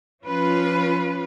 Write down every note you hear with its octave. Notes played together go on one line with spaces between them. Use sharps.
F3 C#4 F4 B4